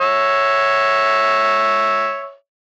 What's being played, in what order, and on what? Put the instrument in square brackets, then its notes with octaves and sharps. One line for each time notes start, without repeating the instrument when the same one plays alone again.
[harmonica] C#5 E5